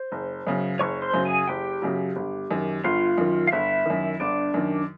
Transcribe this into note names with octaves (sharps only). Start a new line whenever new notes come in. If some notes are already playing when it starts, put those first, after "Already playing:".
Already playing: C5
F#1
F#2 C#3 F#3
F#1 C#5 C#6
C5 C6
F#2 C#3 F#3
G#4 G#5
F#1 G4 G5
F#2 C#3 F#3
G1
F#2 D#3
G1 F4 F5
F#2 D#3
F5
G1 E4 E5
F#2 D#3
G1 D4 D5
F#2 D#3